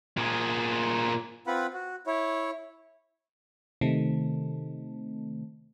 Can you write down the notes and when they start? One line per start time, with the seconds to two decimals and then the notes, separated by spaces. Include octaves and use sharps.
0.17 A#2 G#4
1.47 C4 F4 B4 F#5 B5
1.73 F#4
2.07 E4 C#5
3.81 C3 D#3 A3